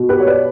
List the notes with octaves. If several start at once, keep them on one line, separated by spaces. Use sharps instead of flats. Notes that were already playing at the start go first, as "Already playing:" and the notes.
Already playing: B2
G4 B4
C#5
B4 D5